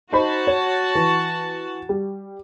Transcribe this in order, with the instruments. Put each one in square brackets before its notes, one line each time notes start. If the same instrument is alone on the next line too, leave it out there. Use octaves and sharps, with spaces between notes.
[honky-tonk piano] D#4 C5 B5 [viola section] F#4 A5
[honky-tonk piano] C#5
E3
G3